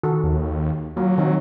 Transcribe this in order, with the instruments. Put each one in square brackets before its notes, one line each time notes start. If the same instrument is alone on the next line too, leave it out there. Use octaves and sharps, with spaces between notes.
[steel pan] D#3 F#4 A4
[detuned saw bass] D#2
[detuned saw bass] F#3 [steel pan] A#3 F4
[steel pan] D#3 C4 D#4